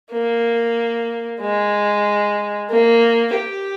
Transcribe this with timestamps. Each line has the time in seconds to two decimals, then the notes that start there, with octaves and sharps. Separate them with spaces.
0.12 A#3
1.41 G#3
2.70 A#3
3.34 G4